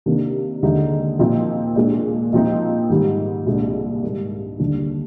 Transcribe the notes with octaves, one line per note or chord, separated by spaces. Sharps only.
C3 D#3 A#3 D4
D#2 D3 G#3 D#4
A#2 F3 C4 D#4
A#2 G#3 D4
A#2 F3 C4 D#4
G#2 D#3 G3
C2 A#2 G#3 D4
G#2 G3 A#3
D#2 D3 G3 D4